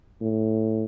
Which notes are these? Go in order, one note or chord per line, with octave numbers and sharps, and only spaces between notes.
A2